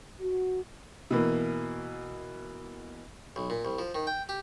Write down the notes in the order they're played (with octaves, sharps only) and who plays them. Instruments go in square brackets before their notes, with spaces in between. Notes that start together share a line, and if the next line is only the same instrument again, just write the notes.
[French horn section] F#4
[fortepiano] B2 E3 A#3
[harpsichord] B1
A#2
C2
F3
D#3
G5
G4